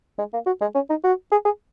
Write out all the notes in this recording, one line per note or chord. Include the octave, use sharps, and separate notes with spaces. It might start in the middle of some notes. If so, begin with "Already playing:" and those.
G#3
A#3
F#4
G#3
C#4
D#4
F#4
G#4
G#4